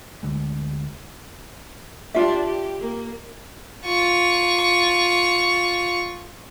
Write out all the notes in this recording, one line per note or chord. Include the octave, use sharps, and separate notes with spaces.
D2 D3 G#3
D4 F4 G4 E5
G4
A#3
F4 C#6